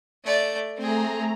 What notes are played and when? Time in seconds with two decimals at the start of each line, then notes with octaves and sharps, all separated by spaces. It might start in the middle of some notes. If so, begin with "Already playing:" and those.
0.24 A3 D5
0.77 A3 C4 G#4 A#5